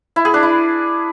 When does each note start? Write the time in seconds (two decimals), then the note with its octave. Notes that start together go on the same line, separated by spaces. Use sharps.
0.16 E4
0.25 G#4
0.34 D4
0.43 E4